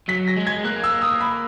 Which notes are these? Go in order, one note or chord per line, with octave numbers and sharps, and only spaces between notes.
F#3 B6
A#6
G#3
G#6
A#3 F#6
E6
D#6
B5